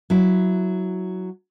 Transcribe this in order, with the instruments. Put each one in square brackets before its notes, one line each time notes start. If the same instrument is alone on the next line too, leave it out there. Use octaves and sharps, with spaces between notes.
[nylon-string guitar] F#3 E4